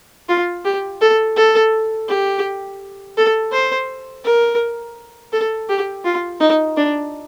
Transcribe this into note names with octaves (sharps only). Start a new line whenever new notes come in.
F4
G4
A4
A4
G4
A4
C5
A#4
A4
G4
F4
D#4
D4